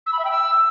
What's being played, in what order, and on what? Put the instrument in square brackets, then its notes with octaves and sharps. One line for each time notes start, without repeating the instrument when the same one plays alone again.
[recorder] E6
B5
E5
G5
E6